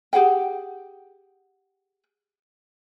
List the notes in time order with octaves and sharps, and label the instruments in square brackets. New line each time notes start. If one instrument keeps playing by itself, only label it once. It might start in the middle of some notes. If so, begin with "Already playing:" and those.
[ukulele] G4 G#4 F#5 G5